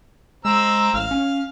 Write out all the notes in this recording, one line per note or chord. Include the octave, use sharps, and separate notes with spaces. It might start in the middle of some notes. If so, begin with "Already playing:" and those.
G#3 C4 A#5 E6
A1 F5
C#4